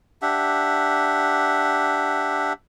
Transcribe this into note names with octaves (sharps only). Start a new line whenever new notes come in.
D4 G4 E5 F#5